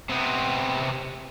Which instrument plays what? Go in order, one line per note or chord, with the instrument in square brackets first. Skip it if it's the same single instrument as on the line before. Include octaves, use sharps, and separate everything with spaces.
[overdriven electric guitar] C3 B3